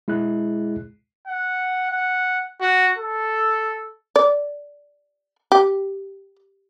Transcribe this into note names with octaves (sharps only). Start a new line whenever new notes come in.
G#3 E4 G#4 F#6
F#5
F#5
F#4
A4
D5
G4